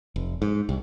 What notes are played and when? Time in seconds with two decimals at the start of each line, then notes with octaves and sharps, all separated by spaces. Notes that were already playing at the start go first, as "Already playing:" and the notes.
0.16 F1
0.42 G#2
0.69 C2